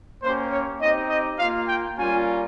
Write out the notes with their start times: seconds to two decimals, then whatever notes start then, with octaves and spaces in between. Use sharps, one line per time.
0.23 A#3 C#4 G4 C5
0.52 C#5
0.81 C4 D#4 G4 D#5
1.10 D#5
1.39 A#3 F4 F5
1.69 G5
1.97 G3 A#3 C#4 F4 G#5